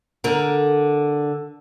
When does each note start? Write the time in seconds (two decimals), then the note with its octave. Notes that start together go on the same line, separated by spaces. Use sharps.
0.24 D3 A#4